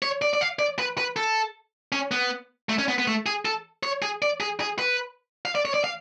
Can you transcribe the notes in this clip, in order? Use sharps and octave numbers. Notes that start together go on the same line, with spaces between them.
C#5
D5
D5
F5
D5
B4
B4
A4
C#4
B3
A3
C#4
B3
B3
A3
G#4
A4
C#5
G#4
D5
G#4
G#4
B4
F5
D5
C#5
D5
F5